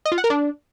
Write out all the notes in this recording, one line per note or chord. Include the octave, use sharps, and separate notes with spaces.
D#5
F4
F#5
A#4
D4